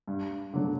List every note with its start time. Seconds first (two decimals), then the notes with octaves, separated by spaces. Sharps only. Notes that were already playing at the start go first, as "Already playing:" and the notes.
0.08 G2
0.53 D3 F#3 A3